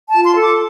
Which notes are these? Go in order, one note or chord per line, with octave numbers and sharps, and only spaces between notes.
A5
F4
C6
A4 D6